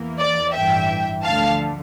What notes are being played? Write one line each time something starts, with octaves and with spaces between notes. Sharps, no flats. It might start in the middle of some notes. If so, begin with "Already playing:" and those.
Already playing: E2 E3 A#3
D5
A1 G2 E3 E5 G5
D2 D3 F3 A3 F5 A5